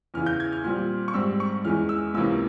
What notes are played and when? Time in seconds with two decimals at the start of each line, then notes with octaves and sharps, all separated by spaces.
0.14 E2 C#3 E3 F6
0.26 G6
0.40 G#6
0.52 F6
0.64 A#2 G3 C4 F6
1.08 C#6
1.14 G#2 G3 C4 E6
1.40 C#6
1.64 E2 E3 G#3 C#4 F6
1.89 E6
2.14 C#2 C3 E3 A#3 C#4 E6